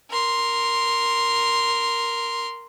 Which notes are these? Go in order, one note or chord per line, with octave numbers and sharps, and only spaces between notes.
A#4 C6